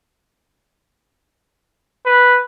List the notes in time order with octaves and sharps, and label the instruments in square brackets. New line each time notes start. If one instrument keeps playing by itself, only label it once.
[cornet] B4